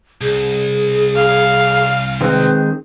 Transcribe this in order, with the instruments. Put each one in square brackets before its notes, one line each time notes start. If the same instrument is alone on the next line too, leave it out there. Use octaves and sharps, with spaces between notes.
[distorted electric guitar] C2 [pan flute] G#4
[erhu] F5
[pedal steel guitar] D#3 G#3 C4 [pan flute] B4